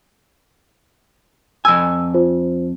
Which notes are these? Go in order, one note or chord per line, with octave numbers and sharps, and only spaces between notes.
F2 G#5 E6
F4 C5